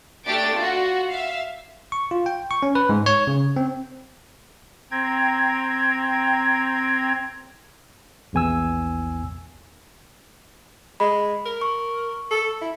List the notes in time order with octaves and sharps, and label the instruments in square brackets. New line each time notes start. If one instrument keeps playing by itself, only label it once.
[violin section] A3 D4 G4 A6 D7
F4 F#4
E5 F5
[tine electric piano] C#6
F4
G5
C#6
C#4
B4
G#2
C#5
C#3
C4
[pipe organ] C4 G5 A#5 G#6
[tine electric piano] A#1 E2 G#5 E6
[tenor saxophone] G#3 [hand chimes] B5
[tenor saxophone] A#4
[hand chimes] C#6
[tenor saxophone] A4
E4